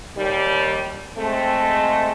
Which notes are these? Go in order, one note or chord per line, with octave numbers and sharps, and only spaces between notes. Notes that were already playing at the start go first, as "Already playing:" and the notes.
D#2 G3
G#3 A3 C4